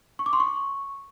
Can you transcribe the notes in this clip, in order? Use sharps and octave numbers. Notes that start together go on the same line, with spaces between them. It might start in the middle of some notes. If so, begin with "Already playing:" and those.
C#6
D6
C6
C#6